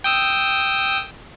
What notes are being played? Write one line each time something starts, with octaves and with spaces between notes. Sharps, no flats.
G5 D#6 E6